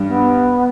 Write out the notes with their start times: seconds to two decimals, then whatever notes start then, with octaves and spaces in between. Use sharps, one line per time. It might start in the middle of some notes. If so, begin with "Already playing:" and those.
Already playing: G2 G3
0.08 B3